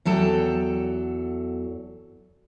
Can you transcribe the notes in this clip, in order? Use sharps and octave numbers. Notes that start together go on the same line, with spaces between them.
E2 F#3 A4 G5